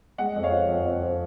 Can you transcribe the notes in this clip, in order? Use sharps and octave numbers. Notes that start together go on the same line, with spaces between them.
G#3 D#5 F#5
F2
C#5 F5
F3
F2
F2
F3